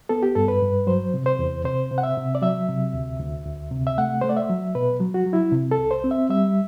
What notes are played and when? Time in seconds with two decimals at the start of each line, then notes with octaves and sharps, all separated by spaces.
0.09 B3 A4
0.23 G4
0.35 G2 A4
0.48 B4
0.62 G2
0.87 F#3 C5
1.14 C3
1.26 C5
1.39 E2
1.64 C3 C5
1.91 C3
1.98 F#5
2.03 E5
2.17 C3
2.35 D5
2.42 F#3 E5
2.69 C3
2.94 D2
3.20 D2
3.46 D2
3.71 C3
3.87 E5
3.98 A3 F#5
4.21 A3 C5
4.29 D5
4.37 E5
4.50 F#3
4.75 B2 B4
5.00 F#3
5.14 F#4
5.26 F#3
5.33 E4
5.52 C3
5.71 A4
5.79 C2
5.91 C5
6.04 C4
6.11 E5
6.29 G3 E5